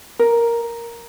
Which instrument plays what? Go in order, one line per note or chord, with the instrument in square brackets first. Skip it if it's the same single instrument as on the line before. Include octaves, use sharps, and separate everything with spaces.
[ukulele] A#4